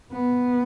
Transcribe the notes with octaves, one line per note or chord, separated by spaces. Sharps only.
B3